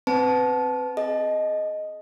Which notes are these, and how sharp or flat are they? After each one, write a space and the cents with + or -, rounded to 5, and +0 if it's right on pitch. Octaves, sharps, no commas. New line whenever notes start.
C4 +0 B4 +20 A5 -20
G#4 +30 D#5 +0